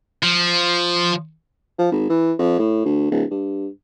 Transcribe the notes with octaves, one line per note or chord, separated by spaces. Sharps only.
F3
F3
G#1
E3
F2
A2
D2
D1
G2